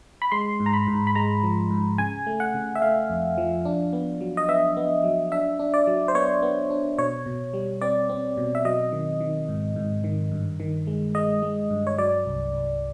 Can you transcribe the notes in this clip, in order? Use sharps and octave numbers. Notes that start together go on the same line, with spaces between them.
B5
G#3 C6
G#2
A#5
B5
G#2
B5
G#3 A#5
F3
G#2
C#3 G#5
A3
F#5
C#3
E5
A3 F5
F2
F3
D4
B3
F#3
D#5
B3 E5
B3
F#3
D4 E5
D4
D5
F#3
C5
B3 C#5
B3
D4
B2 C#5
B2
G3
C4 D5
C4
B2
E5
F#3 D#5
D#3
D#3
G#2
G#2
D#3
G2
D#3
G#3
G#3 D#5
G#3
G2
C#5
F#3 D5
C2
C2